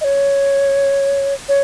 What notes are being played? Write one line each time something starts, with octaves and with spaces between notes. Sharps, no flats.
D#5
C#5
C#5